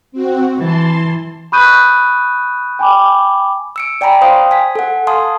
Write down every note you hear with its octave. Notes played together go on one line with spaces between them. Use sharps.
C4 F#4
E3 A5 C6
B5 C#6 D#6 F#6 G6 D#7
G5 G#5 B5 D6
E6 C#7 D7
D5 G5 G#5 A#5 B5
C5 F5 G5 C6 D#6
G#5 B6
A4 F#5
F5 G#5 A5 C6 D#6